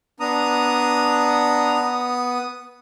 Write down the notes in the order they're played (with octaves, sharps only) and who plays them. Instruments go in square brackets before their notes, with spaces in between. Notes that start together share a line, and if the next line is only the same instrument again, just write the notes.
[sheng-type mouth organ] B3 D#6 [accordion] D4 A#5